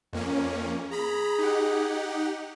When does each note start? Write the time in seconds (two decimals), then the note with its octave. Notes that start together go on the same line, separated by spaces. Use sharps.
0.13 F2 A#3 C#4
0.91 G#4 A#5 B5
1.38 D#4 G4 F#5